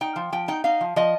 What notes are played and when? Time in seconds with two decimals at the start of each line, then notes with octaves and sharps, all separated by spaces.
0.01 D#4 G5
0.16 F3
0.32 F3 G5
0.48 D#4 G5
0.64 D#4 F5
0.81 F3
0.96 F3 D#5